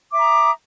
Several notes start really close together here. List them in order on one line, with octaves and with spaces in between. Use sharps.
D6 E5 A#5 D#6